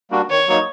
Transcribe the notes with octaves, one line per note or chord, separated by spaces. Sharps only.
G3 A#3 D4 F#4
D#3 C#5
F#3 A#3 D#4